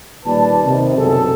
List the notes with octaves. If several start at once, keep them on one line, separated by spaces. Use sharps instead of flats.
D#2 A#2 G3 B4 D5 A5
C3 D#3
C#2 F#2 B2 F#3 G#4 A4